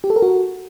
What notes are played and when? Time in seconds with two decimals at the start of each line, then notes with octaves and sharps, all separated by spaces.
0.04 G4
0.10 A4
0.16 A#4
0.22 F#4